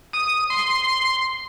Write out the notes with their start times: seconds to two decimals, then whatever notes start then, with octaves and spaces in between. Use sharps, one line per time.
0.13 D#6
0.50 C6